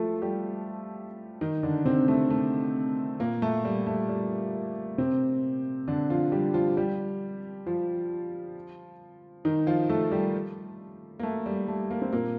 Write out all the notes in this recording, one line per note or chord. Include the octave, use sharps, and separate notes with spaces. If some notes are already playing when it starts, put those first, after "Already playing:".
Already playing: F3 A3 F4 A4
G3 G4
D#3 D#4
D3 D4
C3 C4
A3
A3
A#2 A#3
A3
G3
A3
G3
C3 C4
D3 D4
F3 F4
G3 G4
F3 F4
G3 G4
F3 F4
D#3 D#4
F3 F4
A3 A4
G3 G4
A#3
A3
G3
A3
A#3
C4
A#2 A#3